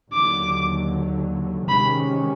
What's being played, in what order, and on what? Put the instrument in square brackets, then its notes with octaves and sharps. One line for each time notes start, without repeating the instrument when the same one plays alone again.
[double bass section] D#2 D3 F#3 [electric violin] D6
[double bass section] C3 D#3 G#3 C#4 [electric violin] B5